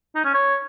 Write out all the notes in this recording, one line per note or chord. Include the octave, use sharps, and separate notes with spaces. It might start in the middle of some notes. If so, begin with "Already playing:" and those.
D#4
C#4
C#5